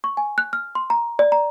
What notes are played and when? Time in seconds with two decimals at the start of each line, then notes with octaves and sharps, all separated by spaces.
0.04 C#6
0.17 G#5
0.38 F#6
0.53 F6
0.75 C6
0.90 A#5
1.19 D5
1.32 A#5